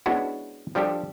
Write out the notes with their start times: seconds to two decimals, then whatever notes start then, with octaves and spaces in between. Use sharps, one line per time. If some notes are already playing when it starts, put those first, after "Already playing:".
0.06 G#3 B3 C#4 D4 E4 F#4
0.75 F3 G3 D4 G4 A4